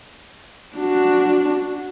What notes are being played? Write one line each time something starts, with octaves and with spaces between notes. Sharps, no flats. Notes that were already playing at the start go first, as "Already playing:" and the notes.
D4 F#4